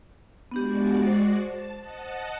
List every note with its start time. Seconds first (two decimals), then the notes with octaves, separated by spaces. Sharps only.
0.51 G#3 B3 D4 F#4 G4 D5
1.06 C5
1.43 A5
1.79 D#5 F#5 A5